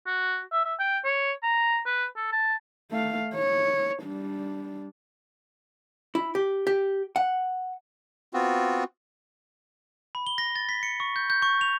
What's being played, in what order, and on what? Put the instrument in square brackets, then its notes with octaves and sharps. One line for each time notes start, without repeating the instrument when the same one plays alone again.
[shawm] F#4
E5
E5
G5
C#5
A#5
B4
A4
A5
[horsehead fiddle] A3 F5
C#5
G3 D4
[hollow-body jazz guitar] E4
G4
G4
F#5
[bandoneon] B3 C4 F4 F#4
[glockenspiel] B5
G7
A#6
A6
B6
C#7
C#6
G6
G6
C#6
F7